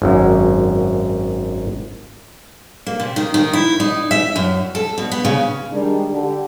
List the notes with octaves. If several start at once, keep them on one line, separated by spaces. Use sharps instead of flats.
G#1 F#2
A#3
C3
D#3
D#3
E4
D#4
E5
F#2
A4
B2
B3
C#3
D#3 G3 G#3 D4
D3 G4